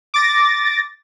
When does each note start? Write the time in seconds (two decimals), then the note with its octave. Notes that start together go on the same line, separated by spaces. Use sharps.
0.14 D6 A6 A#6